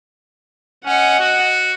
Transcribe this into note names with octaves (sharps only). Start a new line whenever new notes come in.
C#4 D#5 F#5
F#4